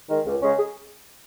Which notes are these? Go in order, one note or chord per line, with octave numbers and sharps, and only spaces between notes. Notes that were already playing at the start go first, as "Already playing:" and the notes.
D#3 G#3
C#2
C#3 G#3 C#4
G#4